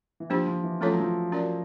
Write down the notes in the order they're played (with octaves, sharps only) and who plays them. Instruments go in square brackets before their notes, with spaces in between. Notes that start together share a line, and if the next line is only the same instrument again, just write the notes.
[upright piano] E3
[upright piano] F3 [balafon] A#3 D4 G4 C5
[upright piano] F3
E3
[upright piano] F3 [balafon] A3 C#4 F4 A4 C#5
[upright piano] F#3
F3
[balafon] C#4 F#4 A#4 D5